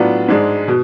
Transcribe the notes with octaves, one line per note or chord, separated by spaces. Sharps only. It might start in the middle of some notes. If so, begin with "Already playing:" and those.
Already playing: A2 F#3 B3 D4 F4
G#2 G#3 D4
B2